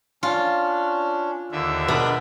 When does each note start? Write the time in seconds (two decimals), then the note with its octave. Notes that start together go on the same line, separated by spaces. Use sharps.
0.23 C#4 D4 F4
1.52 D#2 D3 E5
1.88 B2 G#3 D4 A#4 E5 B5